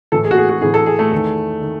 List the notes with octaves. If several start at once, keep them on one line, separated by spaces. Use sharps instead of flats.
A2 E3 A4
G#4
F#4
G#4
F#4
A2 E3 G#4
A4
G#4
A3
E2 D#3
D#3